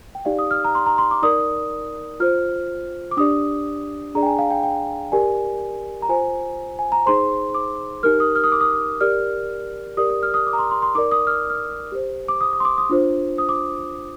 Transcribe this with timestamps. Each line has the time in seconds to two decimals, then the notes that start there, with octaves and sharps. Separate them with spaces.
0.15 G5
0.25 D#4 G4 D5 F5
0.39 D#6
0.51 F6
0.65 A#5
0.75 C6
0.86 A#5
0.98 C6
1.11 D6
1.22 D#4 A#4 D5 D#6
2.20 F4 C5 F6
3.11 D6
3.17 D4 G4 D5 D#6
4.15 D4 G#4 D5 A#5
4.23 G5
4.26 G#5
4.39 F5
4.50 G5
4.63 G5
5.12 G4 A#4 D5 G#5
6.02 A#5
6.09 F4 C5 G#5
6.79 G#5
6.92 A#5
7.06 D#4 G#4 C5 C6
7.54 D6
8.03 D#4 G4 A#4 F6
8.20 D#6
8.36 F6
8.44 D#6
8.52 D6
8.61 D#6
9.01 G4 A#4 D5 F6
9.97 G4 A#4 D5 D#6
10.10 D#6
10.23 F6
10.34 D#6
10.47 D6
10.53 A#5
10.59 C6
10.71 C6
10.82 C6
10.95 D#4 A#4 D5 D6
11.11 D#6
11.27 F6
11.50 F6
11.92 G4 C5
12.28 D6
12.41 D#6
12.53 D#6
12.60 C6
12.65 D6
12.78 D#6
12.89 D4 F4 C5
13.38 D#6
13.49 D6